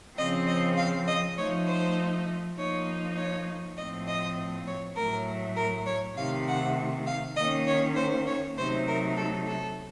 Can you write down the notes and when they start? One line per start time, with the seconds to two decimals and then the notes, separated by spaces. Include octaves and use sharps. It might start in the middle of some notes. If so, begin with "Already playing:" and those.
0.17 C#3 F3 C4 D#5
0.47 D#5
0.77 F5
1.07 D#5
1.37 F3 A3 D#4 C#5
1.67 C5
2.56 F3 A#3 D#4 C#5
3.17 C#5
3.76 A2 F3 A3 C4 D#5
4.07 D#5
4.67 C#5
4.96 A2 F#3 A3 A#4
5.56 A#4
5.86 C#5
6.16 C3 D#3 A3 F5
6.47 F#5
7.06 F5
7.36 D#3 A#3 C#4 D#5
7.67 C#5
7.96 C5
8.26 C#5
8.56 C3 F#3 A3 D#4 C5
8.87 A#4
9.17 A4
9.47 A4